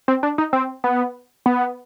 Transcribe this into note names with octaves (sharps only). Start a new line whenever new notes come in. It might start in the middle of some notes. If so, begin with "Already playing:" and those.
C4
D4
D#4
C4
B3
B3